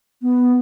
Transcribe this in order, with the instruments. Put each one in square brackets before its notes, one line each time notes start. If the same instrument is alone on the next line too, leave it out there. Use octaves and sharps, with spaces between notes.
[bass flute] B3